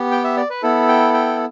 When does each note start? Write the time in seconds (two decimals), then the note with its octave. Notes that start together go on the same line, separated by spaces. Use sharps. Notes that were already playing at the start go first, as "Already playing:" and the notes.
Already playing: B3 G4
0.12 G5
0.24 E5
0.37 D5
0.50 B4
0.62 B3 E4 A4
0.88 G5
1.14 G5